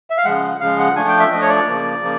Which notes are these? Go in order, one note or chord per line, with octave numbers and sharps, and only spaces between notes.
E5
F5
C#3 F3 G#3 F#5
C#3 F3 G#3 F5
F#5
F3 A3 D4 G#5
G5
E5
F3 A3 D4 D#5
C#5
D5
C#3 F3 A#3
C#3 F3 A#3